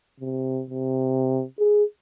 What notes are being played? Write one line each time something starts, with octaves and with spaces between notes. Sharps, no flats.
C3
C3
G#4